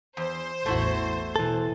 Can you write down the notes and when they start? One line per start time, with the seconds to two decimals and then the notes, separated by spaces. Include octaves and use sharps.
0.17 E2 C5
0.66 A1 E2 A3 E4 F#4
1.36 B2 E3 A4